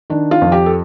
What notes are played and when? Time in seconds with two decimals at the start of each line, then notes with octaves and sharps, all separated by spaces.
0.10 D#3 D4
0.31 F4
0.42 F2
0.52 G4
0.66 A4